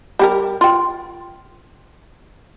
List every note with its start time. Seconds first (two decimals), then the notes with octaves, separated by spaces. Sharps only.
0.19 G3 G4 A#4
0.61 F4 G5